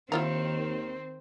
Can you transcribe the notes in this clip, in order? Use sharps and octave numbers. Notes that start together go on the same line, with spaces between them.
D#2 D#3 C4 E4 F4 A#4